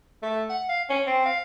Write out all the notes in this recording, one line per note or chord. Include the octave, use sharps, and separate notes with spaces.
A3
F#5
F5
C#4
C4
F5